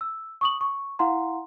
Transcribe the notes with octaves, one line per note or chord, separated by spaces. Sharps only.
E6
C#6 D#6 F#7
C#6
E4 F5 F#5 A#5 C6